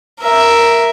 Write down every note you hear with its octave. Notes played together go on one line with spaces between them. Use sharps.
A#4 E5